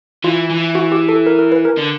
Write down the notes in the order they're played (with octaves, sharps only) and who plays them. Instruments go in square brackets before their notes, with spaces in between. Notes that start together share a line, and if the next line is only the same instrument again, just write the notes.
[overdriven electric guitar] E3 [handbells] F4
[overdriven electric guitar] E3
[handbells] F#4
G4
A4
A#4
A#4
B4
A#4
[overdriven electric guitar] D3